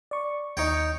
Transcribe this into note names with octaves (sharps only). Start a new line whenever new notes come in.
D5 C#6
D#2 D#4 C#5 G5 C#7